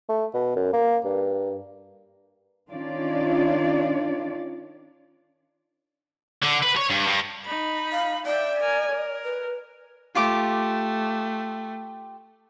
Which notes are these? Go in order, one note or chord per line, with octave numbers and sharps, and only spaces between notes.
A3
B2
F#2
A#3
G2
D#3 C#4 D4 F4 D5
D3
B4
C#5
G2
G2
D#4 B5
F5
D5 E5 G5
A#4 G#5
A#4
B4
A3 F4 G4 D6